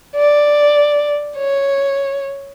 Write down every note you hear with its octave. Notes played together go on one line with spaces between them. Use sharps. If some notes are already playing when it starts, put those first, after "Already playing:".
D5
C#5